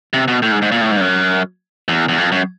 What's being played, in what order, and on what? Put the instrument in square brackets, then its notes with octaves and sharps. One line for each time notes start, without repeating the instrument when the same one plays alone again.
[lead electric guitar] C3
B2
A2
G#2
G#2
A#2
A2
G#2
G2
F#2
E2
E2
F2
F#2